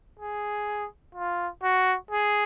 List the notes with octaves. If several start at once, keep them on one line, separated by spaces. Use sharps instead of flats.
G#4
F4
F#4
G#4